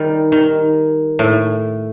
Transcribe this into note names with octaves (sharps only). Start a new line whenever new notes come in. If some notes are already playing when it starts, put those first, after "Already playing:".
Already playing: D#3 G3
D#3
A2